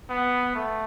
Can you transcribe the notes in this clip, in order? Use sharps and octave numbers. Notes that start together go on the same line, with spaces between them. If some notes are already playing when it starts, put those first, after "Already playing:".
B3
A3